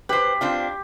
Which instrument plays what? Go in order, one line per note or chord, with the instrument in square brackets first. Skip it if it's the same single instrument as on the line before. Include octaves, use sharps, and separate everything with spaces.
[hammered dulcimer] G4 [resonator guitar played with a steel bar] B4 C5
[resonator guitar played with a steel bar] C4 D4 F4